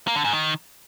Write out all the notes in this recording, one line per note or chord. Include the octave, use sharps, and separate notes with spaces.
A#3
D3
G#2
D#3